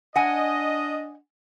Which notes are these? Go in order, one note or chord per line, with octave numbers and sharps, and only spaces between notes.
D4 D#5 F#5 G#5